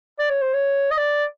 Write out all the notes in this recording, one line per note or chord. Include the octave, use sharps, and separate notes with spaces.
D5
C#5
C5
C#5
D#5
D5